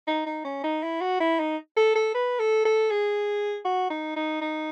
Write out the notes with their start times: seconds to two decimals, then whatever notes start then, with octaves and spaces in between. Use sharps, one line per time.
0.07 D#4
0.26 D#4
0.45 C#4
0.64 D#4
0.83 E4
1.01 F#4
1.20 E4
1.39 D#4
1.77 A4
1.95 A4
2.14 B4
2.39 A4
2.65 A4
2.90 G#4
3.65 F#4
3.90 D#4
4.16 D#4
4.41 D#4